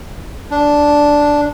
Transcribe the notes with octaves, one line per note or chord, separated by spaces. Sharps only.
D4